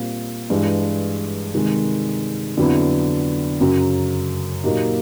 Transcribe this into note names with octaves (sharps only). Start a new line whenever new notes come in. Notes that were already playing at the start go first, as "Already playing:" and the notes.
Already playing: A#2 G3 C4 F4
G2 E3 G#3
C3 D#3 G#3
F2 D3 F#3 B3 E4
F#2 C#3 F#3
A#2 F#3 A#3 D#4 G4